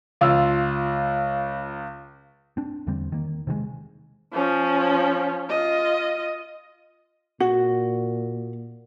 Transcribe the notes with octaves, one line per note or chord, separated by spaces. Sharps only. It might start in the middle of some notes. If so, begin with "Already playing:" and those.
C#2 F4 F5 E6
C4 D4
E2 D3 G3 C4
D#3 A#3
C3 D#3 F3 G#3
F3 C#4
F4 D#5
A#2 F#4